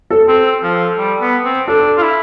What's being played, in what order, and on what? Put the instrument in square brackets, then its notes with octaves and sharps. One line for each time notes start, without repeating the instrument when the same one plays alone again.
[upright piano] A4
[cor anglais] C4
F3
G3
B3
C4
[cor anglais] D4 [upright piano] A4
[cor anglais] F4
E4